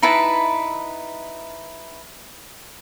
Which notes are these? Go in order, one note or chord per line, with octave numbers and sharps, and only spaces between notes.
D#4 E4 B4 A5